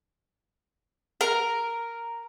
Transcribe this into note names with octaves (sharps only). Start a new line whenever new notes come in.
A#4